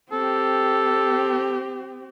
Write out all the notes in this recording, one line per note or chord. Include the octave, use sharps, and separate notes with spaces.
C4 G4 A4